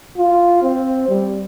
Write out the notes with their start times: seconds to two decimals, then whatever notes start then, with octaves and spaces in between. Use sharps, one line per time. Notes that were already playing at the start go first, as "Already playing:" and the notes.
0.17 F4
0.63 C4
1.08 G3